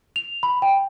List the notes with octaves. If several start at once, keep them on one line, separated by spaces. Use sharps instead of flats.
F7
B5
G5